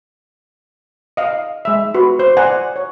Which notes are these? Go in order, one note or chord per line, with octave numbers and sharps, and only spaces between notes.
D#5 F5
G#3 E5
F#4 B4
C5
C5 D5 F#5 G#5 A#5
C#5